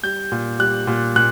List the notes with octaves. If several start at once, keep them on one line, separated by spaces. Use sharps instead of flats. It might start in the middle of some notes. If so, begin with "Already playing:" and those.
G3 G6
A#2
G3 F#6
A#2
A#2 F#6